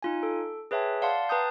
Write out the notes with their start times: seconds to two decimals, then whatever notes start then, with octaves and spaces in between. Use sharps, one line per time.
0.03 D#4 F4 G#5
0.23 A4
0.71 G#4 B4 C#5 E5 G5 A5
1.02 D5 F5 F#5 A5 C6
1.29 B4 G5 A5 A#5 D#6 G6